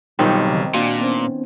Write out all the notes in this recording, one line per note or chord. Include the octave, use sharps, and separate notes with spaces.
B1 D#3 G3 C4 D#4 F4
C#3 E3
A#2 D4 F#4 F5
B3 C#4 C5